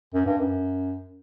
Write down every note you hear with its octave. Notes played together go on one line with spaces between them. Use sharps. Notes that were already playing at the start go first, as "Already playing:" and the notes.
F#2
G2
F#2